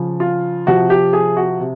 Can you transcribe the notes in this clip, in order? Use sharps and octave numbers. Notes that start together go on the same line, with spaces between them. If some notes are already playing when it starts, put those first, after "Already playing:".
Already playing: C#3 F3
F4
C3 F3 F#4
G4
G#4
F#4
C3